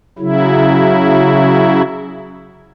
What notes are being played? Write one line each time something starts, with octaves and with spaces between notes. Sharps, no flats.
C#3 F#3 E4